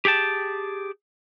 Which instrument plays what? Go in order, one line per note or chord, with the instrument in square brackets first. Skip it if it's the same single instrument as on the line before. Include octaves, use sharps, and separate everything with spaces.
[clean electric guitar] G4 G#4 G5 A5